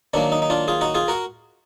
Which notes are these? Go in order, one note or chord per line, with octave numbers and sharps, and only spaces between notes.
D#3 F#3 A#3 D4
D#4
D#4
D4 F4
F4 G#4
D#4 F#4
F4 G#4
F#4 A#4